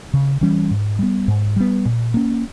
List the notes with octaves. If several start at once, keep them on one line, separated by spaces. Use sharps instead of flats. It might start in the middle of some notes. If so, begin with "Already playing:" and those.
C#3
E3 G3 C#4
G#2
G3 B3
G#2
G3 B3
A#2
A#3 C#4